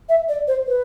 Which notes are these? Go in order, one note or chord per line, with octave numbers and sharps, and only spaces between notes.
E5
D5
C5
B4